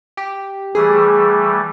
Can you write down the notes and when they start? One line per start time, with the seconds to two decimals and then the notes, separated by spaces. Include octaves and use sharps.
0.17 G4
0.75 E3 G3 A3 G#4